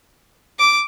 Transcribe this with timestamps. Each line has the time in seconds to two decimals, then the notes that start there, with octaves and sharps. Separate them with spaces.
0.59 D6